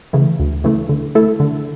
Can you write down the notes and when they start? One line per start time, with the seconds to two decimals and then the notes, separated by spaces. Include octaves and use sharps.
0.13 C#3 E3 A3
0.39 D2
0.64 C#3 E3 A3
0.89 D3
1.15 A3 E4 A4
1.40 D3